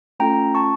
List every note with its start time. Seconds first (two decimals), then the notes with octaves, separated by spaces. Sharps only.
0.20 A3 C#4 F4 A4 G5 A#5
0.55 A5 C#6